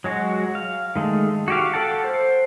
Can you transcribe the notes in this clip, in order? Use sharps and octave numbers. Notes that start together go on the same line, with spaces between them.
F#3 G#3 F#4
F5
D#3 G#3 A3
F#4 G4 F5
A4 F#5 G5 A5
C5